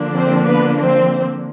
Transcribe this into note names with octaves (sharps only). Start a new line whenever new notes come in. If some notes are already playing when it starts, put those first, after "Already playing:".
Already playing: D3 F3 A#3 D4
C4 C5
B3 B4
C4 C5